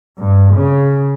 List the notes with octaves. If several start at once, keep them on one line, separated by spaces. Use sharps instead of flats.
G2
C#3